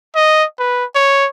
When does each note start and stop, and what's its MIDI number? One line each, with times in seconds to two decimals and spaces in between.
0.16 0.45 75
0.59 0.85 71
0.95 1.27 73